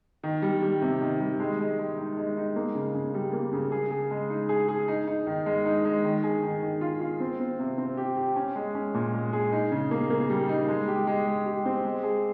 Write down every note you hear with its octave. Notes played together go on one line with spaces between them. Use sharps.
D#3
G3
G3
C3
D#3
G3
G#3
G#3
G#3
D#4
G#3
D#4
A#3
C#3
C#3
G3
A#3
C#3
G#4
G#4
G#3
D#4
G#4
G#4
D#4
D#4
D#3
G#3
D#4
G#3
D#3
G#4
D#3
D#3
F4
F4
C4
C4
C3
C4
G4
G4
C#4
G#3
C#4
A#2
G#3
G#4
D#4
C#3
A#3
A#3
G3
D#4
G#3
G4
G#3
G#3
G4
C4
G#3
G#4